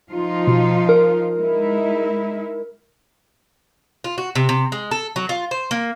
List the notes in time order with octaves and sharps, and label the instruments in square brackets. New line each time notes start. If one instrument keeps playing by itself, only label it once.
[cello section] F3 D#4 F4
[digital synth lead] B2
A#4
[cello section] G#3 D#4 E4
[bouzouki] F4
F#4
C3
C3
G#3
A4
F#3
F4
C5
A#3